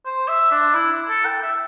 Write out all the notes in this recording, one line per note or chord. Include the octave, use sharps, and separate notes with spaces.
C5
E5
D4
E4
A4
G5
E5